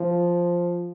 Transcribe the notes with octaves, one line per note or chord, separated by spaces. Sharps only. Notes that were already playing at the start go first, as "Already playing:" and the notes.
Already playing: F3